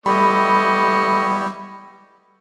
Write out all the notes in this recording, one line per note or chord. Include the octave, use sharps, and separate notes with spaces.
G3 A3 B3 E4 G4 D#5 B5 C#6